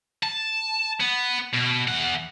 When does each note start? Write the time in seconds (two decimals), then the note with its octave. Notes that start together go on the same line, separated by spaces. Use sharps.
0.23 A5
1.00 B3
1.54 B2
1.88 E2 F#5